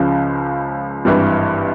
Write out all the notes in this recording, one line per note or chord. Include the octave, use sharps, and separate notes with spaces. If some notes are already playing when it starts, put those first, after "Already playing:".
Already playing: C#2 C#3 F3
G#1 G2 E3 G3